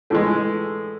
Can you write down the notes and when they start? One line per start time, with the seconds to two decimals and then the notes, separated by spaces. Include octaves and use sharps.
0.10 A2 E3 G#3 A4